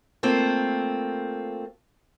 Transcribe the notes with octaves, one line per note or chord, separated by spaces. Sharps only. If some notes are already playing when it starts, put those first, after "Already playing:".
A3 A#3 C4 F4